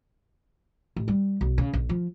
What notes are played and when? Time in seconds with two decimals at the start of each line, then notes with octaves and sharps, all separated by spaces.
0.96 A1
1.08 G3
1.41 B1
1.58 C#3
1.73 A#1
1.89 F3